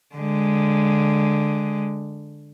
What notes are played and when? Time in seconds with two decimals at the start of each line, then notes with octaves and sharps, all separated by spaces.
0.15 D3 G#3